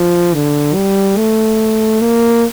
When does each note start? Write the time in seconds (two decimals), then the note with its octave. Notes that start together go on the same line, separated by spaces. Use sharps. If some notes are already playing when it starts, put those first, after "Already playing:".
Already playing: F3
0.34 D3
0.75 G3
1.17 A3
2.01 A#3